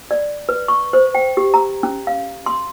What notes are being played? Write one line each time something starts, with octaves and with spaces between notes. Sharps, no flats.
D5
B4
C#6
C5
G5
G4
A#5
C#4
F5
C6